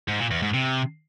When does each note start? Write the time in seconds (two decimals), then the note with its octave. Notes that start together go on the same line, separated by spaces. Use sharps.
0.08 G#2
0.19 A#2
0.31 E2
0.42 G#2
0.54 C3